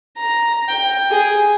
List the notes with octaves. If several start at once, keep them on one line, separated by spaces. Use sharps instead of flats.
A#5
G5
G#4